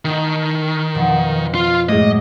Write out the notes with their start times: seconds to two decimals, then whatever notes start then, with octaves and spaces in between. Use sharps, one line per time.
0.05 D#3 A3 D#4 E4
0.95 F2 B2 F3
1.55 F4
1.89 F#2 A2 G#3 D#5 D6